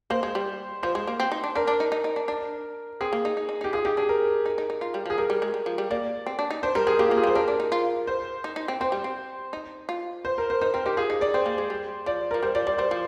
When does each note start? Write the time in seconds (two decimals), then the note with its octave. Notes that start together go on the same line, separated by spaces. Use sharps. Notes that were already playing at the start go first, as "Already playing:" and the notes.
0.10 A#3 C5
0.23 G#3
0.35 G3
0.83 F3 C5
0.95 G#3
1.08 A#3
1.20 C4
1.32 D#4
1.44 D4
1.56 D4 A#4
1.67 D4
1.80 D#4
1.92 D#4
2.04 D#4
2.16 D4
2.28 D4
3.01 C4 G#4
3.13 A#3
3.25 D#4
3.37 D#4
3.49 D#4
3.61 D#4 G4
3.73 F4 G#4
3.85 D#4 G4
3.97 D4 G#4
4.09 A#4
4.46 D#4
4.58 D#4
4.70 D#4
4.81 F4
4.94 G3
5.06 F3 G#4
5.18 G3 A#4
5.30 G3
5.42 G#3
5.54 G3
5.66 F3
5.78 G3
5.90 A#3 D5
6.26 C4
6.39 D4
6.51 D#4
6.63 D4 C5
6.75 G3 A#4
6.87 G3 G#4
6.99 A#3 G4
7.08 F4
7.11 A#3
7.17 G#4
7.24 G3 C5
7.35 D4 A#4
7.48 D4
7.60 D#4
7.72 F4
8.07 C5
8.44 D#4
8.56 D#4
8.68 C4
8.81 C4 C5
8.92 G3
9.04 C4
9.53 D#4
9.89 F4
10.25 C5
10.38 A#4
10.50 C5
10.61 D#4 C5
10.74 C4 A#4
10.86 D#4 G4
10.97 F4 G#4
11.10 D#4
11.21 D#4 D5
11.34 C4 C5
11.46 A#3
11.58 G#3
11.70 G3
12.06 F3 D5
12.31 F3 A#4
12.43 G3 C5
12.55 F3 D5
12.67 G3 D5
12.78 G3 C5
12.91 F3